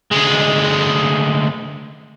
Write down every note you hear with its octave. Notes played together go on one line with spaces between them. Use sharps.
D2 G#3